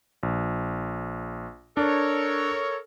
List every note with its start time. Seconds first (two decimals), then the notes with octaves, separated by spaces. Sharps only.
0.23 A#1
1.77 D4 A4 A#4 C#5